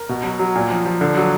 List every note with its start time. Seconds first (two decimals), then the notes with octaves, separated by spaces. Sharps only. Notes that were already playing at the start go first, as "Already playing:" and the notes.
Already playing: A#4
0.09 B2
0.24 F#3
0.39 F#3
0.55 A#2
0.71 F3
0.85 F3
1.01 D3
1.17 F#3